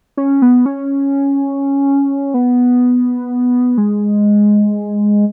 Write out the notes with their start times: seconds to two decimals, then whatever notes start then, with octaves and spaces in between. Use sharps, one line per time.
0.17 C#4
0.42 B3
0.66 C#4
2.34 B3
3.78 G#3